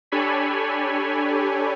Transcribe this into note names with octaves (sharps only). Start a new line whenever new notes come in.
D4 G4 A4 C#5 G#5 B5